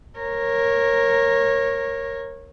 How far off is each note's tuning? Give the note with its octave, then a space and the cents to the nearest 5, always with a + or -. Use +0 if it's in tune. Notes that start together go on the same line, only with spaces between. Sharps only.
A#4 +0 C#5 -20